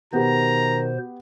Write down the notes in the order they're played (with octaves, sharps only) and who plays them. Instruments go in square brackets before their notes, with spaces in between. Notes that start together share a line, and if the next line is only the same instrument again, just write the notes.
[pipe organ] B2 C5 [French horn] D#3 [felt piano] B3 G4 [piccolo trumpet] A#5